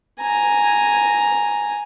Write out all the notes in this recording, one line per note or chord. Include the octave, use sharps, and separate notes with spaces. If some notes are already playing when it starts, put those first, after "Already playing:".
G#5 A#5